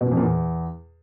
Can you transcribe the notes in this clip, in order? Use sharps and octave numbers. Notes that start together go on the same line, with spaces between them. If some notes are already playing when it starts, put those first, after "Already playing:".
B2
A#2
F2
A#2
E2